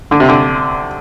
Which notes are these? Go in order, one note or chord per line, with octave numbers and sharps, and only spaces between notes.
D3
C3
D3